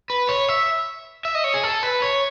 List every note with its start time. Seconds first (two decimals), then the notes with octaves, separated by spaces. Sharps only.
0.10 B4
0.29 C#5
0.48 E5
1.25 E5
1.35 D#5
1.44 C#5
1.54 G#4
1.63 A4
1.83 B4
2.02 C#5